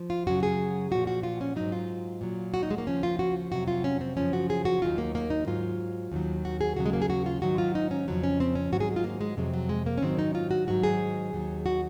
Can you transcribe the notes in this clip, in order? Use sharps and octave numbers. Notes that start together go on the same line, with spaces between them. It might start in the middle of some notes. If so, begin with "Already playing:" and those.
Already playing: F3
F4
F#2 C#3 F#3 F#4
G#4
A#2 F3 F#4
F#4
F4
C#4
G#2 F#3 D#4
F4
A#2 F#3
F#4
D#4
G#3
A#3
D#2 C#3 F3 C#4
F4
F#4
F2 C3 F#3 F#4
F4
C#4
C4
F#2 C#3 F3 C#4
F#4
G#4
F#4
D#2 D#3 F#3 F4
A#3
A#3
D#4
G#2 F#3 F4
D#2 D#3 F#3
F#4
G#4
D#2 C#3 F#3 F#4
G#3
A#3
G#4
F#4
F4
G#2 D#3 F#3 F#4
F4
D#4
C#4
F2 C#3 F3 F#3
C#4
C4
C#4
G#2 D#3 F#3 F#4
G#4
F4
A#3
G#3
F2 C3 F#3 G#3
F#3
G#3
A#3
C#4
G#2 D#3 F#3 C4
D#4
F4
F#4
G#2 D#3 F#3 F#4
G#4
D#2 D#3 F#3
F#4